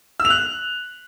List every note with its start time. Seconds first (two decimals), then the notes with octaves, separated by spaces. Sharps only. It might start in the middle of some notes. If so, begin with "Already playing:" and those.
0.20 E6
0.25 F7
0.30 F#6